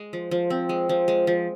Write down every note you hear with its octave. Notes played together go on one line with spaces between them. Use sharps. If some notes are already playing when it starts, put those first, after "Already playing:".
Already playing: G#3
F3
F3
C4
G#3
F3
G#3
F3